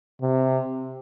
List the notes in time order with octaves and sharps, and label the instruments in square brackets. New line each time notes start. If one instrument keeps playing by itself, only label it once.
[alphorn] C3